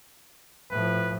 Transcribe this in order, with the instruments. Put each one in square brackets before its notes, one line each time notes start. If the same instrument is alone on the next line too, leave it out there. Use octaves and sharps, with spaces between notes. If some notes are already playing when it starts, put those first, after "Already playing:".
[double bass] A2 F3 [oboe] B4